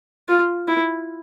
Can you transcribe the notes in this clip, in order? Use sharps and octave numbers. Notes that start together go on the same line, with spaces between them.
F4
E4